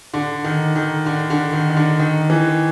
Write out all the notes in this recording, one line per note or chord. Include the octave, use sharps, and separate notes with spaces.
D3
D#3
D#3
D3
D3
D#3
D#3
D3
D#3
E3